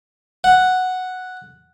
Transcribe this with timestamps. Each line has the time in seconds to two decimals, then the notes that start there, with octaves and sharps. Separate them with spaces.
0.44 F#5